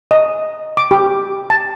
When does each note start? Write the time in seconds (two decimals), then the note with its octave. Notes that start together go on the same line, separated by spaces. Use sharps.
0.11 D#5
0.77 D6
0.91 G4
1.50 A5